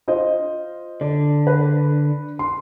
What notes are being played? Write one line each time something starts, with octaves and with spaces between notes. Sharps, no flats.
F4 C5 D#5
D3 D5
B4
C6